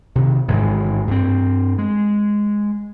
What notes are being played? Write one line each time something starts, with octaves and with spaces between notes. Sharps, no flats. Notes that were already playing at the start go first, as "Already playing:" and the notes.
C3 D#3
A1 G#2 D#3 G#3
G2 C4
G#3